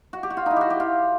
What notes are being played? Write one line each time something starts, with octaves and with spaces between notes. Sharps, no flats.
F#4
G4
F#4
F4
D#4 E4
F#4 G4
G4
F4